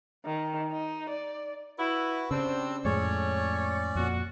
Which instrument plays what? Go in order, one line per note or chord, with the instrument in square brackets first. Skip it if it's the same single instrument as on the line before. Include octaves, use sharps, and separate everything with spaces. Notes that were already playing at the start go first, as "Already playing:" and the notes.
[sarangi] D#3
D#4
D5
[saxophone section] E4 [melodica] F#4 B4
[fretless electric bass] C#3 [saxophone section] G3 C4 [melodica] D4 E6
[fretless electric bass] F2 A2 G#3 [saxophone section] A3 C#5 [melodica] C#4 D5
[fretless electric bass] F2 A#2 [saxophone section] F#4